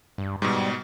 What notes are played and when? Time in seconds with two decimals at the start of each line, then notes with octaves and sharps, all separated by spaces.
0.18 G2
0.42 G#2 B2 G3